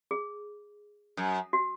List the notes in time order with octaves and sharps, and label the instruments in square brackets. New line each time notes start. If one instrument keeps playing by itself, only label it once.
[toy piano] G#4
[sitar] F#2
[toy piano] F#4